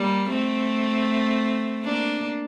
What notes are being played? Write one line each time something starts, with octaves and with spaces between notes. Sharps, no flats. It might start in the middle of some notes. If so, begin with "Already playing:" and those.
Already playing: G3 A#3
A3 C4
A#3 D4